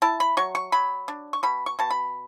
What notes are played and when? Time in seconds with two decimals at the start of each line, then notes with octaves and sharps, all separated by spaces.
0.02 E4 A5
0.20 B5
0.37 F#3 C#6
0.55 C#6
0.72 F#3 B5
1.08 D4
1.33 C#6
1.43 B2 B5
1.66 C#6
1.79 B2 A5
1.90 B5